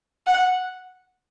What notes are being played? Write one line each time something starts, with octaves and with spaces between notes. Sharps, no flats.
F#5